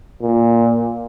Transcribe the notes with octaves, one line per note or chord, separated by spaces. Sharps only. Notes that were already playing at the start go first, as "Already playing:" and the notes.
A#2